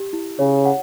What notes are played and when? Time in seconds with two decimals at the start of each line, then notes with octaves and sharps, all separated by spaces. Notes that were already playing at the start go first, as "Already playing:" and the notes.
Already playing: G4
0.13 E4
0.39 C#3 C#5
0.65 F#5